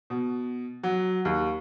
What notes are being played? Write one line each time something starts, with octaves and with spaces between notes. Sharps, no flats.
B2
F#3
D#2